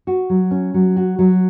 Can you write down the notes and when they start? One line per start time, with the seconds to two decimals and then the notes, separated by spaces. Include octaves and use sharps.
0.07 F#4
0.30 F#3
0.51 C#4
0.74 F#3
0.96 F#4
1.19 F#3